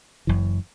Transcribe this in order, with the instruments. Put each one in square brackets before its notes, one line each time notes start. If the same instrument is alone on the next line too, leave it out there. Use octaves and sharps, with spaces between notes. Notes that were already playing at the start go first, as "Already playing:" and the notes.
[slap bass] F#1 F#2 E3